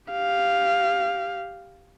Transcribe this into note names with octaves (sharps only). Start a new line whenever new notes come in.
G4 F5